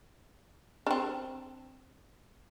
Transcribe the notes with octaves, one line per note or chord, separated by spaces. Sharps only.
C4 D4